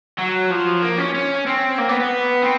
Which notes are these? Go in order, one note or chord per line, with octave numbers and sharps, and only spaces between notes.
F#3
F3
A#3
C#4
C#4
C4
A#3
B3
B3
C4